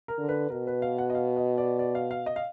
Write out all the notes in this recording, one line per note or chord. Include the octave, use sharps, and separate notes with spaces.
A#4
D3
B4
B2 A#4
B4
F5
F#5
D#5
F5
D#5
D5
D5
F5
F5
D#5
F5